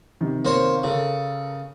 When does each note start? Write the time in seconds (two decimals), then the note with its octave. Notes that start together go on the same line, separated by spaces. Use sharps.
0.21 C3 D#3
0.45 A#3 C5 C#5
0.84 C#3 A4 A#4